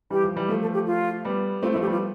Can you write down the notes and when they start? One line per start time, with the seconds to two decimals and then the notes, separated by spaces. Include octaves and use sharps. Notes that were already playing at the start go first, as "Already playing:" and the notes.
0.10 E3 G3 G4
0.24 F3
0.36 E3 G3
0.49 F3 A3 A4
0.61 A4
0.74 G4
0.86 F4
1.25 G3 B3
1.62 A3 C4 F4
1.72 E4
1.75 F3 A3
1.81 G4
1.87 G3 B3 F4